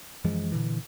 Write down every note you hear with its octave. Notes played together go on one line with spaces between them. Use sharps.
F#2 E3 F3 G#3
A#2 D3 E3